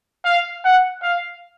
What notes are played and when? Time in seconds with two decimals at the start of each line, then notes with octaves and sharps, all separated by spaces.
0.25 F5
0.65 F#5
1.03 F5